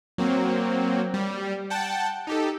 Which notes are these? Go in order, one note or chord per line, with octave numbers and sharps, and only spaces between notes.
F#3 A#3 C4
G3
F#5 G5 A5
D#4 G4 A4